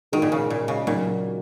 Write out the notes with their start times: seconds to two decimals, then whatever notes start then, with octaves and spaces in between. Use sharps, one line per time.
0.12 D#3 G#3 D#4 F#4 A#4
0.22 A#2
0.32 C#3
0.50 A#2
0.68 C#3
0.87 A#2 F#3 D#4 F#4 A#4